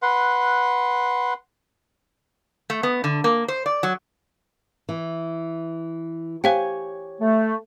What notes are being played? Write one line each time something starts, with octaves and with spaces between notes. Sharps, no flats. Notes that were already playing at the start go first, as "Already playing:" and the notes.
B4 F#5 C6
A3
B3
D3
A#3
C5
D5
F#3
E3
G4 C5 C#5 F5 G5 G#5
A3